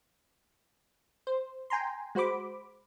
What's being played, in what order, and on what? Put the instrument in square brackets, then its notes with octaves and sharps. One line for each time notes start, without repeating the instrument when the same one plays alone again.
[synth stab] C5
G5 G#5 A#5 C6
G#3 F#4 C5 B5 D6